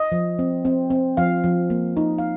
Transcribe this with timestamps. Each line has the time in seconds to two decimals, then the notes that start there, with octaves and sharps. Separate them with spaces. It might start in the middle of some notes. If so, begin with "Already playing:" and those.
Already playing: D#5
0.12 F3
0.39 C4
0.65 C4
0.90 C4
1.17 F3 F5
1.44 F3
1.70 A#3
1.97 D#4
2.18 F5